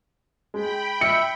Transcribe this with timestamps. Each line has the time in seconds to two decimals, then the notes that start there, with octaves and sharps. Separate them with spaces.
0.54 G#3 G5 B5
1.01 E5 C#7